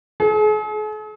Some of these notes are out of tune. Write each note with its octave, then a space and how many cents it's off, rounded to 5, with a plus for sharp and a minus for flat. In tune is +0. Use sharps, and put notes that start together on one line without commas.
G#4 +45